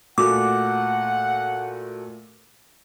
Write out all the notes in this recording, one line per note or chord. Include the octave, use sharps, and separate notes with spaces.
A#2 A3 F#4 F#5 D6